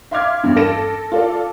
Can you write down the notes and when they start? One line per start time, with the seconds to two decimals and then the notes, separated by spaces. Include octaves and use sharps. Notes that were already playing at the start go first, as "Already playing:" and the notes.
0.11 E5 F5 C6 D6 F6 G#6
0.43 E2 G2
0.56 A4 A#6 D7 E7
1.12 F4 A4 D5